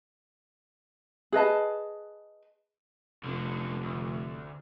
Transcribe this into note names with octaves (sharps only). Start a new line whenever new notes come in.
G#4 B4 D#5 A5
F1 C2 D3
D2